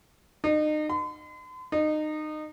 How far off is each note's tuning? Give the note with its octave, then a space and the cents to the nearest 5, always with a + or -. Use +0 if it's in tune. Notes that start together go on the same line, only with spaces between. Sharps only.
D#4 -35
C6 -45
D#4 -25